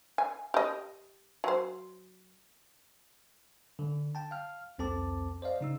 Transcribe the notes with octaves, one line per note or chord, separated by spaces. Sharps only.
G#5
G4 D#5
F#3 C5
D3
G5 A5
F5 F6
C2 F2 C4 A4 A5 D6
C5 D5 D#5 F5
C#3 D#4 E6